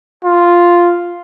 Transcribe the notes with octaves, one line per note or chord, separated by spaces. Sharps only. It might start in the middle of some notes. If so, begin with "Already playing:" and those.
F4